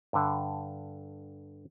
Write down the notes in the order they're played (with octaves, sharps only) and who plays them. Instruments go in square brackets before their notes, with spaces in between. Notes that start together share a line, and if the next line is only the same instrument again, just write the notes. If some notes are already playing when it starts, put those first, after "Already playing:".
[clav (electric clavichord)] G2 D3